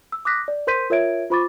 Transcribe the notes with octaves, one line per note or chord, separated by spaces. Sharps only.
E6
D6 D#6 F#6 A#6 B6
D5
A#4 C5 C6 G6 B6 D#7
F4 A#4 C#5 E5 G#6 D7
F4 C5 B5 C#6 D6 A6